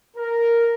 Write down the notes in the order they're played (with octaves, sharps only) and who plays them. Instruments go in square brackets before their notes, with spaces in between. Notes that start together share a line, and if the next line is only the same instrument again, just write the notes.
[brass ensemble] A#4